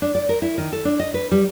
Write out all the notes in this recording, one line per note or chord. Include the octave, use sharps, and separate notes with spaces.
D4
D5
A#4
E4
D#3
A4
D4
D#5
B4
G3